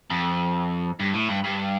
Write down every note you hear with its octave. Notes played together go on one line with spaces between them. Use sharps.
F2
G2
A2
G2
G2